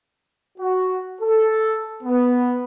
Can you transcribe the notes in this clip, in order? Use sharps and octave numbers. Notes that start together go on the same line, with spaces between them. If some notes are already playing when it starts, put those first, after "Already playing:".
F#4
A4
B3